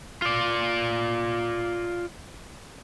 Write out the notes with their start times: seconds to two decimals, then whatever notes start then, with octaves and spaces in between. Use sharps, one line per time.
0.22 F4 D5